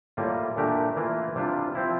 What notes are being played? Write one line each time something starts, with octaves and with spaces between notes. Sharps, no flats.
A2 G3 A#3 F4
A#2 A3 D4 G4 A#4
E3 A#3 F4
C3 G3 D4 F4
F3 C4 E4